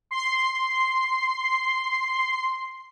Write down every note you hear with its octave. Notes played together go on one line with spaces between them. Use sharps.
C6 C7